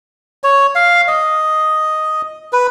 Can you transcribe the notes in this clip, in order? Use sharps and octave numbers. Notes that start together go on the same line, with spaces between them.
C#5
F5
D#5
B4